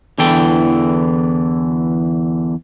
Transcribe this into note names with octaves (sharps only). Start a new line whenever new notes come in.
E2 D3 E3 A4 G5